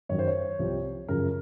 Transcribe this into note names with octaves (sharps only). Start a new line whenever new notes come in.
F#2 D#3 F#3 C#5
C5
C#5
C2 C3 F3
F#2 C#3 F3 A#4